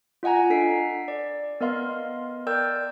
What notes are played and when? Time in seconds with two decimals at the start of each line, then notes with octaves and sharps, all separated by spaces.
0.23 F4 D#5 F#5 G#5 A#5
0.50 D4 A4 B6 C7 D7
1.08 D5
1.61 B3 A#4 D#5 F5 C6
2.47 A#4 D5 G5 E6 G6